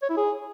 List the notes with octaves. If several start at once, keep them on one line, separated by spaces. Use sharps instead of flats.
C#5
E4
G#4